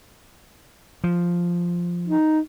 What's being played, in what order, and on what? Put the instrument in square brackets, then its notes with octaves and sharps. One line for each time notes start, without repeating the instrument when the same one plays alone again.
[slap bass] F3
[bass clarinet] D#4